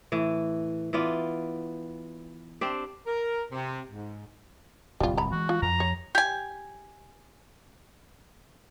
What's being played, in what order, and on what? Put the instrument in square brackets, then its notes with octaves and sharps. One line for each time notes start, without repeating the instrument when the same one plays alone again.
[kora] A2 E3
E3 B3 F4 D5
C4 D4 G4
[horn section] A#4
C3
G#2
[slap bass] D1 C2 [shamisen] G3 F4
[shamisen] A#5 B5
[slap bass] E3 G#3 [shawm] F#4
[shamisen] F4
[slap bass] F2 F3 [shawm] A#5
[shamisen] C#5
[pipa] G4 G#5